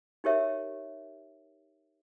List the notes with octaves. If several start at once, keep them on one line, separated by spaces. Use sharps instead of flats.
D#4 G4 A#4 C#5 E5